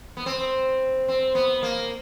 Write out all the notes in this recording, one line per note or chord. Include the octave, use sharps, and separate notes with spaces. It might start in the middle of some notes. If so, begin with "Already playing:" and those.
B3
C4
C4
B3
A#3